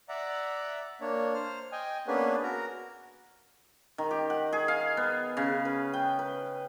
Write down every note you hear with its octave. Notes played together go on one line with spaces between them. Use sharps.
D5 E5 F#5 A#5
A#3 D4 C#5
C5 F6
D#5 G5 G#5
A#3 B3 C#4 D4 G#4 B4
F#4 A#4 A#5
D#3
G4
F#5
G#4
F5
B3
C#3
B4
G5
B4